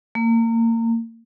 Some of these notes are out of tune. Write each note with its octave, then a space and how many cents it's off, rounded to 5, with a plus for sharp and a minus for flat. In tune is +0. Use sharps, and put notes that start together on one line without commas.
A#3 -30